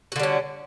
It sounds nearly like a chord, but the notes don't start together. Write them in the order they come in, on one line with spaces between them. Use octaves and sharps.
F#4 D3 G3 C#4